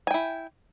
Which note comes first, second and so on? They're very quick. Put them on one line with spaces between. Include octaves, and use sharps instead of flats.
G#5 G5 E4